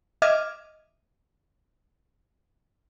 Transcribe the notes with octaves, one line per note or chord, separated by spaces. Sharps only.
D#5 E5 D6 F6 G#6